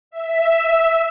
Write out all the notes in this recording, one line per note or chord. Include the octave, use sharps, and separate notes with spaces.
E5